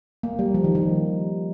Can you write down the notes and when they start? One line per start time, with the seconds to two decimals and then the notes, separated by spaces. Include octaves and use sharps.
0.23 A#3
0.39 G3
0.54 F3
0.64 D#3
0.75 D#3